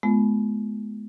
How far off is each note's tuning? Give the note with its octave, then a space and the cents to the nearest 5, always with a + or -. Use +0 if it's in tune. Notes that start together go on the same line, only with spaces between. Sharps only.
G#3 +35 B3 +0 F4 -20